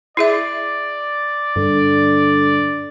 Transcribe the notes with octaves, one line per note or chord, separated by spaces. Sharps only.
E4 G#4 D5 E5
G2 D3